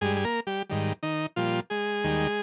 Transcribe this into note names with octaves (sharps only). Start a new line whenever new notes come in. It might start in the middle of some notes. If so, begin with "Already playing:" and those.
G2 G3 G#3 G#4
G#4
A#3 A#4
G3 G4
G#2 D#3 G3
D#3 D#4
A#2 F3 G3 F4
G#3 G#4
D#2 D#3 G3